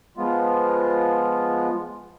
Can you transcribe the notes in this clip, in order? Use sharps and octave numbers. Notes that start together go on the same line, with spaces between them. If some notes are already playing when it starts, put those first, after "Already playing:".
F3 G#3 B3 F4